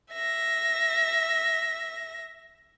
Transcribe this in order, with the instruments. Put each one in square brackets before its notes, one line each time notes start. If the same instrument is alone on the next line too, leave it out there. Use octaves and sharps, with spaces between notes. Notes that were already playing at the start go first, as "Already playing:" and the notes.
[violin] E5 A#6